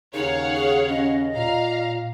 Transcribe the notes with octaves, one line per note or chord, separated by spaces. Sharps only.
D#2 C#3 D#4 C#5 F5 F#5
G#4
C#4 D#5
A#2 F5 A#5